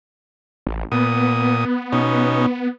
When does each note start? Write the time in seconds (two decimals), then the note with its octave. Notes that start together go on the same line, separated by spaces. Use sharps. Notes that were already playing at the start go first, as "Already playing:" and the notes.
0.67 A1
0.92 A#2 B3 D#6
1.92 B2 C#4 D#4